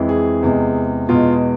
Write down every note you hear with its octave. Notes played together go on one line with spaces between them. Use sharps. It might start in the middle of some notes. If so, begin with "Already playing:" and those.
Already playing: F2 E3 G#3
G#4
E2 C3 G#3
E2 B2 G#3 F4